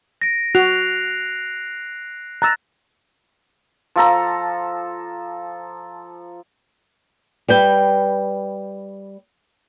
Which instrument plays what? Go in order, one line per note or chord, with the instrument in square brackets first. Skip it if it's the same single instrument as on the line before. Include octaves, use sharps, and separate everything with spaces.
[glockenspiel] A#6 D7
[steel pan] F#4 [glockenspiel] F#6 C7 F7
[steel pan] A#5 E6 [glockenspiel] F#6 A6 A#6
[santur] F3 A4 A#5
[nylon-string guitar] G3 B4 G5